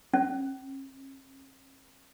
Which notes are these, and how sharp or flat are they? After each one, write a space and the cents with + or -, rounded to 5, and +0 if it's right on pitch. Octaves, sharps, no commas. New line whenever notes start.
C#4 -45